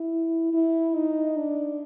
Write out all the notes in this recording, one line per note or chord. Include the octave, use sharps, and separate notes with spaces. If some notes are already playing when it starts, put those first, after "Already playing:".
Already playing: E4
E4
D#4
D4